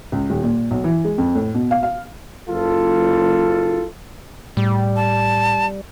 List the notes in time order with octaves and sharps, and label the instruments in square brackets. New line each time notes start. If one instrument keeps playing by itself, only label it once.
[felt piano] C#2
D#1
A#2
B1
E3
G#3
F2
A2
B2
F5
F5
[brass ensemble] F#1 F4 A4
[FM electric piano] A2 [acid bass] G3
[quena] A5